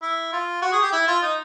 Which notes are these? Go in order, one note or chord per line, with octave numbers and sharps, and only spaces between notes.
E4
F4
F#4
G#4
G4
E4
F4
D#4